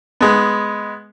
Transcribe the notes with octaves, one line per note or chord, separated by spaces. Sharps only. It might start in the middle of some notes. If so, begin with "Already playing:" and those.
G#3 B3